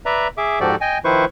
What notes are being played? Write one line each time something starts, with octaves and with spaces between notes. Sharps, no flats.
B4 D5 E5 A#5
G#4 E5 D6
G#2 F3 F#4 G4 A4 D5
D#5 G5 G#5
D#3 F3 E4 B4 C5 C#6